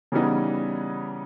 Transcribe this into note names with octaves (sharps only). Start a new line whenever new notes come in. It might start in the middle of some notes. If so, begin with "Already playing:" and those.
C#3 E3 G3 B3 D#4